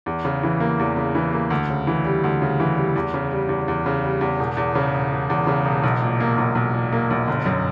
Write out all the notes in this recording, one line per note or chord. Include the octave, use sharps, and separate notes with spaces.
E2
C#3
E3
A#3
E2
C#3
E3
A#3
D2
C#3
E3
G3
D2
C#3
E3
G3
E2
C#3
G3
E2
E2
C#3
G3
E2
E1
E2
C#3
E1
E1
E2
C#3
E1
B1
A#2
A#3
B1
B1
A#2
A#3
B1
G1
F#2